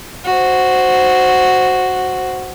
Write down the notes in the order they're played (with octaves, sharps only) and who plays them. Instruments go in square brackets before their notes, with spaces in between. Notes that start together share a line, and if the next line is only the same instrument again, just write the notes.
[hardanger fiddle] F#4 C5